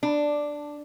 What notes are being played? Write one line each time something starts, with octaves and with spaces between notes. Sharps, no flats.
D4